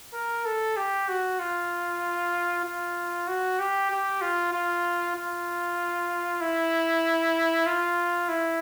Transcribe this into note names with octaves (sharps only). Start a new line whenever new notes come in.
A#4
A4
G4
F#4
F4
F4
F#4
G4
G4
F4
F4
F4
E4
F4
E4